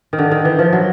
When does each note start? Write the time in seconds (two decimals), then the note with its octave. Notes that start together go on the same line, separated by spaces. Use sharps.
0.13 D#3
0.18 D3
0.31 D#3
0.45 E3
0.59 F3
0.73 F#3